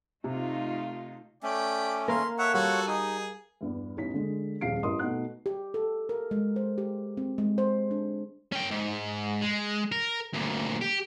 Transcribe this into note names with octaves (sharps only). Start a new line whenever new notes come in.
C3 A3 D#4 F4
A3 C#4 D5 G5
A#3 A#4 F5 C6
A4 C#5 E5 F#5
G3 F4 F#4 A4 C#5 F#5
D#4 G#4 D#6
E2 G2 G3
A1 E2 C#4 D#4 B6
D3 G#3
D#1 F2 G#4 F5 C7 D7
A1 E4 A#4 D#5 C6 D#6
B2 A3 D#4 F#5 F#6
G4
A4
A#4
G#3
C5
G4
C4
G#3
C5
D4
C#4 G5
G#2
G#3
A#4
D2 A#2
G4